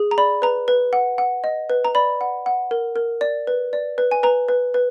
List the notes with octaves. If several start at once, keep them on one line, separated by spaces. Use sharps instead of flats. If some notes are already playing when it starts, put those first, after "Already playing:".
Already playing: G#4
A#5
D5 B5
B4 A#5
B4
F#5
F#5
D#5
B4
A#5
D5 B5
F#5
F#5
A#4
A#4
D5
B4
D5
B4
G#5
B4 A#5
B4
B4